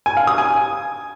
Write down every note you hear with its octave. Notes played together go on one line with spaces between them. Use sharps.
G#5
F5
D#6
G#5